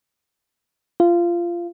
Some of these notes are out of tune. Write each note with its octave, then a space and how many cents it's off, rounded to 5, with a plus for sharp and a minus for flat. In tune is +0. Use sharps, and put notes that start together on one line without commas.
F4 -20